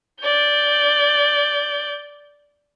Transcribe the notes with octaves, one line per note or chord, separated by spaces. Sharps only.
D5 G6